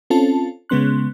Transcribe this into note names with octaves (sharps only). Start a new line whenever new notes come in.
C4 C#4 F4 A4 A5
C#3 G#3 B3 C#4 C6 F#6